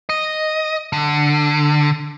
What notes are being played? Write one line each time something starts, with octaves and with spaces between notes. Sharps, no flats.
D#5
D3